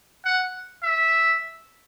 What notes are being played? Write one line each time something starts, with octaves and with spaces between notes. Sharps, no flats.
F#5
E5